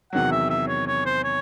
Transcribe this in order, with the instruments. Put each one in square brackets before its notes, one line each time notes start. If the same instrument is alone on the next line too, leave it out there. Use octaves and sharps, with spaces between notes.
[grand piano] E2 C3 D#3 F#3 [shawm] F#5
[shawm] E5
E5
C#5
C#5
C5
C#5